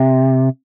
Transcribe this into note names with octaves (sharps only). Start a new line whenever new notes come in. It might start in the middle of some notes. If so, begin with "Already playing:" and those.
Already playing: C3